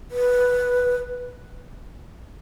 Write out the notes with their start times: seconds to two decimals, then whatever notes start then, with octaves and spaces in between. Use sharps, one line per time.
0.11 B4